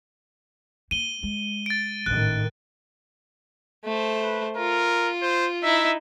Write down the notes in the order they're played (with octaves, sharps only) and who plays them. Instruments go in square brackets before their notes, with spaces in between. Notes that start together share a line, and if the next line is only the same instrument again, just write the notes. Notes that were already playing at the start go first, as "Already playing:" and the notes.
[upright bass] A#3 [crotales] D#7 G7
[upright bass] G#3
[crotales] A6 D7
[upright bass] G#1 C#4 [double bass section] A2 D#3 [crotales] F#6
[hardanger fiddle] A3 C5
[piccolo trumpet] B4
[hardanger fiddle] F4 [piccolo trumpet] A#4
[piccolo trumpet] C5
[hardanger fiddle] D#4 E4 [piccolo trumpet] E5